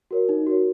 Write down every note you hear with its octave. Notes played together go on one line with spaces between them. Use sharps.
F#4 A#4 C#5
D#4
F#4 A#4 C#5